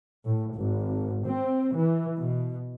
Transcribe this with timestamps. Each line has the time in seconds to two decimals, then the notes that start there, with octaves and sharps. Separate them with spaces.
0.25 A2
0.54 G#1
1.24 C4
1.75 E3
2.17 B2